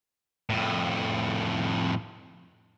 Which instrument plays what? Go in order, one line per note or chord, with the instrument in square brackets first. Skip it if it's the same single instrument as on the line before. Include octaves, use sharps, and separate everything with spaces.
[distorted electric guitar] F2 A2